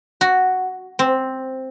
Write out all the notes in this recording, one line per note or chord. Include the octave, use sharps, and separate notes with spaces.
F#4
C4